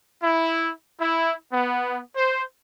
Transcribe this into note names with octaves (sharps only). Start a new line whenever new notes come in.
E4
E4
B3
C5